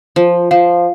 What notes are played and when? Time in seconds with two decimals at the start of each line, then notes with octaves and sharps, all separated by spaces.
0.16 F3
0.51 F3 F5